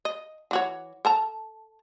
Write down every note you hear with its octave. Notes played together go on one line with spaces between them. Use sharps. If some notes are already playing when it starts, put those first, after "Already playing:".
D#5
E3 F#4 C#5
A4 A5 A#5